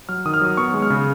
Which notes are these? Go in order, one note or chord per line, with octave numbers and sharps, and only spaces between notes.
F#3 F6
D#3 D#6
F6
F#3 D#6
B3 C#6
G#3
F6
C#3